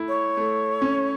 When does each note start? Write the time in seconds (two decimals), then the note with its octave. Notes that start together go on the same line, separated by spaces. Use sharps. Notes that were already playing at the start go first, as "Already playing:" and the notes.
Already playing: A3 E4
0.08 C#5
0.37 A3
0.82 C#4